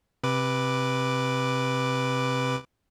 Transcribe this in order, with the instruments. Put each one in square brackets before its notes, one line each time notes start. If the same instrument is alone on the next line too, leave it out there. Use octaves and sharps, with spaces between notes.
[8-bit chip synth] C3 B4 D6